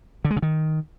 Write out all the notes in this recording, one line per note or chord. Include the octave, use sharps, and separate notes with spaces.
D3
G#3
C#3
D#3